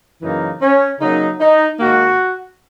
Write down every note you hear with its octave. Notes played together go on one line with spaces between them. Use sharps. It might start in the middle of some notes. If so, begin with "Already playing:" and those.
F#2 C#3 E3 A#3 D#4
C#4
C#3 F#3 A#3 D#4
D#4
G#2 D#3 A#3 F#4